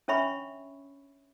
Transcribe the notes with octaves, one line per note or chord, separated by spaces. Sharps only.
C#4 D4 C#5 E5 B5 C#6